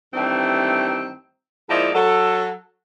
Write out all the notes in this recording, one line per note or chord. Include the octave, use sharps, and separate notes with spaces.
G2 D#3 E3 G3 A3 C4
G#2 F3 A#3 D#4 E4 D5
F#3 A4